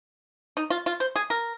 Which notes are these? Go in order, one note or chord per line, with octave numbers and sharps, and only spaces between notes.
D#4
F4
F4
C5
G#4
A#4